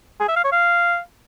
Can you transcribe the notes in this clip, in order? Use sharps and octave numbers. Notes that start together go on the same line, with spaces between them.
G#4
E5
F5
C#5
F5